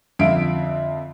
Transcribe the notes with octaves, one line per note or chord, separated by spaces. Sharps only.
F2 D3 E5 F5 D7